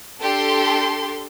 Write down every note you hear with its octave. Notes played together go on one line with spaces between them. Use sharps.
D4 G4 A4 C6